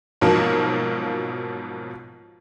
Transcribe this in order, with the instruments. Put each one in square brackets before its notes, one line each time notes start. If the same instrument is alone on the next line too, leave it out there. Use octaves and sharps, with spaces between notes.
[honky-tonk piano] G#2 B2 F3 F#3 A#3